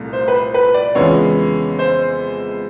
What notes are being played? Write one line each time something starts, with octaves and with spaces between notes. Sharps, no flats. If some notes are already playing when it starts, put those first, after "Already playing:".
Already playing: C2 A#2 A3
C5
B4
C5
B4
D5
F2 C#3 E3 G#3 B3 C#5
C5